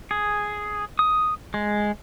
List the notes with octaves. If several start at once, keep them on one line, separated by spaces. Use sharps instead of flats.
G#4
D#6
G#3